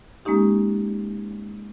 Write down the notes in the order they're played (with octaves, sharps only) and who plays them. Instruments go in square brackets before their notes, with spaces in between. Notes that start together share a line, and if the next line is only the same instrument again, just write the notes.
[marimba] G#3 A#3 C#4 D#4 G4